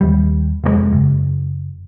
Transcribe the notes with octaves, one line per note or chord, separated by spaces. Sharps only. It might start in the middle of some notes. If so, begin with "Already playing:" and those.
D#2 G3
F1 A#2 G#3
F#1